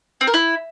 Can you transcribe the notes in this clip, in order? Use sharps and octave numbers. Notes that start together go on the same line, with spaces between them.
C4
A#4
E4